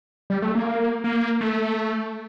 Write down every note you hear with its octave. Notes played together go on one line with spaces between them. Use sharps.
G3
A3
A#3
A#3
A3